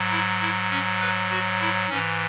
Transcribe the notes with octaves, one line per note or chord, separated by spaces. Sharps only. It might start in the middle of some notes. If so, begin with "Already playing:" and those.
Already playing: G#2 F#3
E4
E4
C#4
B4
F#4
E4
G#2 E3 C#4